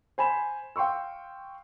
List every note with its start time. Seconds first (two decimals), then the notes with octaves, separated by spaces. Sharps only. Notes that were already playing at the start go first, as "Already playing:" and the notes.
0.18 C5 G#5 B5 E7
0.76 F5 G5 C6 C#6 E6